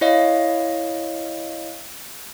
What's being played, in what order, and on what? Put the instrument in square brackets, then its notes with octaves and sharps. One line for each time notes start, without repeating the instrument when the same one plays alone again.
[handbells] E4 C#5 D#5 F5